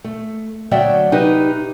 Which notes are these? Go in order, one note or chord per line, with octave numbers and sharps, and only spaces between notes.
A3
D2 F#3 D5 E5 G5
C3 D#4 E4 G4 B4